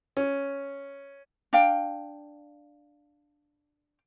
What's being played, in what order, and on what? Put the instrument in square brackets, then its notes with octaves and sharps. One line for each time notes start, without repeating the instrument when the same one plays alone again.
[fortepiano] C#4
[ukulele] D4 F5 G5